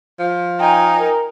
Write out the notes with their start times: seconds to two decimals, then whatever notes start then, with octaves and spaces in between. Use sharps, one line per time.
0.19 F3
0.60 D#4 G5 G#5 A#5
0.99 A#4